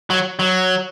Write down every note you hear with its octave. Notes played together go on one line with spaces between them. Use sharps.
F#3
F#3